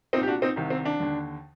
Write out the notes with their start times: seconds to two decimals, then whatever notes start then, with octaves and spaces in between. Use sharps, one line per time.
0.13 C2 A#2 C4 D#4
0.23 G4
0.28 D4 F#4
0.42 C4 D#4
0.56 C2 C3 D#3
0.70 C4
0.85 D4
1.00 D#2 D3